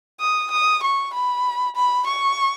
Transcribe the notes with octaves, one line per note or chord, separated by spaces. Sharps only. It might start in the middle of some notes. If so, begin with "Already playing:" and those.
D#6
D#6
C#6
B5
B5
C#6